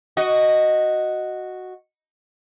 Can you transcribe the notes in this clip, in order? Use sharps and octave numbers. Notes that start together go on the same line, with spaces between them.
F#4 D#5